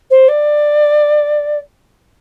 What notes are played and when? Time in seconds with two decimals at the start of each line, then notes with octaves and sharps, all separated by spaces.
0.10 C5
0.28 D5